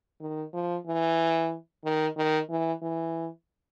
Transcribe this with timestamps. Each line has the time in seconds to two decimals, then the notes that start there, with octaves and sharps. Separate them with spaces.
0.21 D#3
0.54 F3
0.86 E3
1.84 D#3
2.17 D#3
2.50 E3
2.82 E3